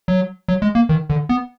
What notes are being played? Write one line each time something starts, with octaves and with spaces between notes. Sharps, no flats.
F#3
F#3
G#3
A#3
D#3
D3
B3